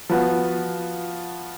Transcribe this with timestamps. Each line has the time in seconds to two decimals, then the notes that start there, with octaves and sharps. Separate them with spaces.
0.09 F3 B3 F#4 B4